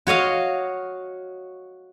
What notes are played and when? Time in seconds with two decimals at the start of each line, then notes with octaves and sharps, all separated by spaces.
0.07 F#4 C#5 D#5 F5